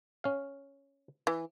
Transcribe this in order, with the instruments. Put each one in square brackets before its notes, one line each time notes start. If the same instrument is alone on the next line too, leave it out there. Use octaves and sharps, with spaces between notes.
[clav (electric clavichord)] C#4 F5
[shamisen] E3